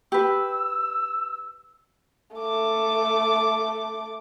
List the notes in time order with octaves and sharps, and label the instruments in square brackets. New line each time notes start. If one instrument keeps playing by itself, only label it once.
[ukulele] G4 B4 [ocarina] E6
[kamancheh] A3 D6